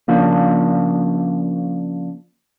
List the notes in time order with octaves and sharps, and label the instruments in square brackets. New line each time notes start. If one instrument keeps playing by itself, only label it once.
[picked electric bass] C#3 F3 A#3 D4